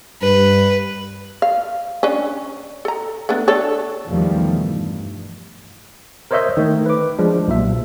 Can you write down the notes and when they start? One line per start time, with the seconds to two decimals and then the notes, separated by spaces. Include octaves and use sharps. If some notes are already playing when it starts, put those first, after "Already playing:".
0.22 G2 B4
1.42 F5
2.03 C#4 D4
2.85 A4 A#5
3.29 A3 B3 D4
3.48 D4 A4 C#5
4.08 E2 B2 D#3 F3 G3 A3
4.59 G2
6.31 A#4 C5 C#5 D#5 E5 G6
6.57 D#3 A3
6.86 B4 D6
7.19 F3 G#3 D4
7.48 B1 A#2 E5